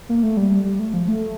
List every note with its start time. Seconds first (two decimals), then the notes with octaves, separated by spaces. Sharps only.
0.09 A#3
0.23 A3
0.37 G3
0.65 G3
0.79 A3
0.94 F3
1.08 A3